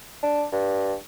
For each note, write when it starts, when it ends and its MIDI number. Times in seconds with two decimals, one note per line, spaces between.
0.23 0.45 62
0.52 0.94 43